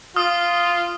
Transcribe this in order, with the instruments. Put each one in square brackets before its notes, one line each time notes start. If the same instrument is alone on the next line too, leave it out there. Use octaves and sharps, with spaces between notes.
[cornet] F4 [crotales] D#6 F6